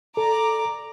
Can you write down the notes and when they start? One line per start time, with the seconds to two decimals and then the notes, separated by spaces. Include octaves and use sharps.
0.17 A4 D5 A#5 D6